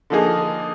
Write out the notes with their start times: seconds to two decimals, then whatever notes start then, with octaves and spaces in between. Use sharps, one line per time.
0.10 D3 F3 A#3 D#4 G#4